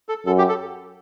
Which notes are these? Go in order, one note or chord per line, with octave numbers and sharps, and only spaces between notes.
A4
F#2 A4
G4
A4